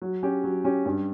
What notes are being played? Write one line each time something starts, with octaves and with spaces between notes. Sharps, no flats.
F#3
C#4 G4
F#3
C#4 G4
G2